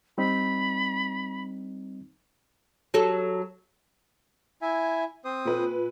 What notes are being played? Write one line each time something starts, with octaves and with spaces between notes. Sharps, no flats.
G3 C4 D#4 B5
F#3 A4
E4 E5 G#5
C4 C5 D#6
A#2 B4